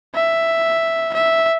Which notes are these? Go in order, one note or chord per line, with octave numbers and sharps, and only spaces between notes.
E5
E5